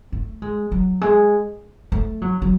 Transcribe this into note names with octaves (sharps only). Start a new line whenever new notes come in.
A3
G#3
F#3
G#3
A3
F#3
F#3